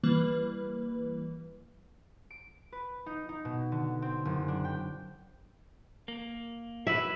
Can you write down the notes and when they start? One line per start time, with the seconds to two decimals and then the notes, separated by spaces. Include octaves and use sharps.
0.03 E3 G3 A#3 B4
2.30 D7
2.72 B4
3.06 D#4
3.29 D#4
3.45 B2
3.72 D3
4.02 C4
4.25 F#1
4.48 D4
4.64 G5
6.08 A#3
6.87 E4 F#4 B4 E5